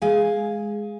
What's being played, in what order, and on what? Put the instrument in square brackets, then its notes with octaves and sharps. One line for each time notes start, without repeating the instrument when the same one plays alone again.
[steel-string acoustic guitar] G#3 F5 G#5